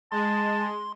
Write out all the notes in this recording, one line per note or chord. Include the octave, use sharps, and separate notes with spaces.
G#3 A5 C6